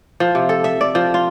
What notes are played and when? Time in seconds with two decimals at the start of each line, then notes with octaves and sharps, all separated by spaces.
0.20 F3
0.35 C3
0.49 A4
0.64 E5
0.81 D5
0.95 F3
1.14 F4